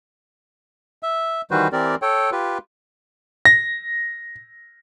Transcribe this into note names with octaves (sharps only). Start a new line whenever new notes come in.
E5
D#3 E3 G3 F#4 B4 C5
E3 C4 G4 A#4 D5
A4 C#5 G5
F4 G4 B4
A#6